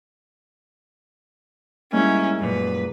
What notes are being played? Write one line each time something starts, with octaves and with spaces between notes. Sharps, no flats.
G#2 G3 A#3 C#4 E4
F#2 A#2 B4